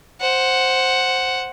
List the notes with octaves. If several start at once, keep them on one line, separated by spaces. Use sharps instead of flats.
C5 F#5